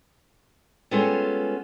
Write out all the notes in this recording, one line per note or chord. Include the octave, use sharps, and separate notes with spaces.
G3 G#3 B3 C#4 F4 A4